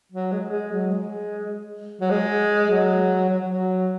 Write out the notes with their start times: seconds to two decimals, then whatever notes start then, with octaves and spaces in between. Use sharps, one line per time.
0.12 F#3
0.32 G#3
0.52 G#3
0.71 F#3
0.91 G#3
2.01 F#3
2.10 G#3
2.70 F#3
3.29 F#3
3.44 F#3